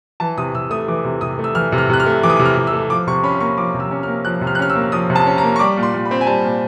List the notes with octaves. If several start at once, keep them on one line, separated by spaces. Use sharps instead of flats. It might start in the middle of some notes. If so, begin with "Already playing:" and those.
E3 A5
C3 D#6
C3 E6
A3 D#6
E3 D6
C3
C3 D#6
A3
E6
E3 F6
C3
F6
C3 F#6
F6
A3
E3 D6
D#6
D6
C3
F6
C3
E6
A3
F3 D6
C3 C#6
C#4 B5
A#3 C#6
F3 D6
C3
E6
C#4
F6
A#3
F3 F#6
C3
F6
F#6
C#4 F6
E6
A#3
F3 D#6
C3
A5
C#4
A#5
A#3
C#6
G3 D6
A#2
C6
A#2
B5
C4
G#5
G3 A5
A#2